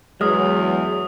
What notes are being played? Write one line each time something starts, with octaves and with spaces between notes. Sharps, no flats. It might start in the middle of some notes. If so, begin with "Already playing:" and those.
E2 F#3 G#3 D#6 F6